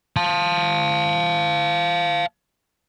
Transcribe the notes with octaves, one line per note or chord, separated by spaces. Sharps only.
F5 A5